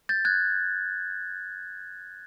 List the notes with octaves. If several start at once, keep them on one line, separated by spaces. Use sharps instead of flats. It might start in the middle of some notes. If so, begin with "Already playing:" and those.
G6 A6
F#6 G#6